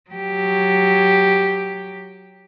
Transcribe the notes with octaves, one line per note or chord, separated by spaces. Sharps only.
F#3 G4